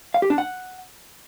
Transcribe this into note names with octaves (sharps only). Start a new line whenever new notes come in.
F5
G4
D4
F#5